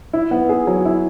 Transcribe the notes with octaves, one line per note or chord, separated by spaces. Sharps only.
E4
B3
G#4
F#3
E4